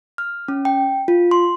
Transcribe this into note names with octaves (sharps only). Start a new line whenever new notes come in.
F6
C#4
G5
F4
C6